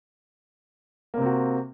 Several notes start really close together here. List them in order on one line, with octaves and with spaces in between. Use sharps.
A#3 C3 C4 F#4